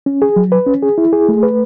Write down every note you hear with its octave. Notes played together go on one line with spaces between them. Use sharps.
C#4
G#4
F#3
B4
C#4
G#4
E4
G#4
A3
B4